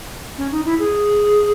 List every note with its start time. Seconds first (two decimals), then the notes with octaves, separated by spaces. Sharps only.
0.38 C#4
0.52 D#4
0.65 E4
0.79 G#4